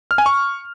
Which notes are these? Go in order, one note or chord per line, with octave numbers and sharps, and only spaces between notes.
F6
G#5
C#6